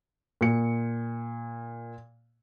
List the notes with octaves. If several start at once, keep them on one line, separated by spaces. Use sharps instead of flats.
A#2 C#7